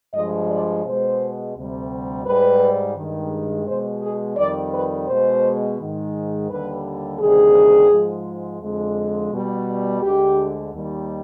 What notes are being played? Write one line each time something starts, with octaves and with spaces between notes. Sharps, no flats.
G2 F3 G#3 D#5
D5
B2 G#3 C5
D2 C3 G3
G#2 G3 B4
G2 D#3 G#3
B2 G#3 C5
G#4
F2 D#3 G3 D5
B4
B2 G#3 C5
G#2 D#3 G#3
D#2 D3 G3 B4
D2 C3 D#3 G3 G#4
G#2 F3 G#3
F2 D3 F3 G#3
B2 G3
D2 D3 G#3 G4
D#2 D#3 G3